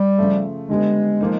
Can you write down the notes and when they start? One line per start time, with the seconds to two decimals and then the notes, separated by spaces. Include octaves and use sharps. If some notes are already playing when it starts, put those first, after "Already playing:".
Already playing: G3
0.18 C#3 F3 A3
0.69 D3 G3 G#3 B3
1.21 F3 A#3 D#4